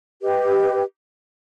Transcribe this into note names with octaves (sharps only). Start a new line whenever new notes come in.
G4 B4 D#5